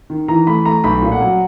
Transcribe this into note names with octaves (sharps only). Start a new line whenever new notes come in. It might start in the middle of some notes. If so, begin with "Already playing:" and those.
D#3
E3 A#5
A3 B5
A3 A#5
B1 B5
A#2
F#5
F#3